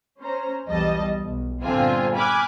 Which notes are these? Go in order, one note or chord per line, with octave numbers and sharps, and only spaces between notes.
C#4 C5 A#5
B1 E2 G3 D#5 A5
B1
G1 A#2 D3 C4 F4 G#5
G#5 B5 D6 F6 F#6 G#6